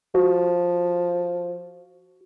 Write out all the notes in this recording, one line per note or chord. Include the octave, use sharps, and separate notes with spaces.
F3 F#4